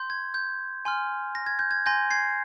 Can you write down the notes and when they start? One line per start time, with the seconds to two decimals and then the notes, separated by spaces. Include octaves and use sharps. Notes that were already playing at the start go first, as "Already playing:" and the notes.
Already playing: C6 G6
0.10 G#6
0.34 G6
0.85 G#5 C6 F6
1.35 A#6
1.46 G#6
1.59 G6
1.71 G#6
1.86 G#5 C6 G6 A#6
2.11 G#6 C7